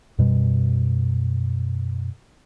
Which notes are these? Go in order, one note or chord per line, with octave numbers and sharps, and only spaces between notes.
F#2 B2 G3